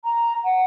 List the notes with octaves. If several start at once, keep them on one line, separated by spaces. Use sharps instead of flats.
A#5
F#5